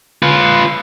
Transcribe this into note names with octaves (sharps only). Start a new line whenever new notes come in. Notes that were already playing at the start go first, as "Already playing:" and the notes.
F4 B4